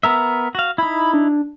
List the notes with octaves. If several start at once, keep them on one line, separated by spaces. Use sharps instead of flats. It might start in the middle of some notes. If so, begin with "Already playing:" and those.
B3 A#4 E5
F#4 F5
D#4 E4 B5
D4